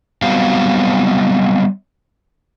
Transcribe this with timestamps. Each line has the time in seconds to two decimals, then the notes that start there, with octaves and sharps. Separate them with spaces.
0.22 F#3 G3 B3 C4 C5 F5